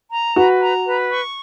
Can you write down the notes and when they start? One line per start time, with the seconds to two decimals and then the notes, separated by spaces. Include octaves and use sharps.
0.11 A#5
0.36 F#4 B4
0.61 A#5
0.86 B4
1.11 C#6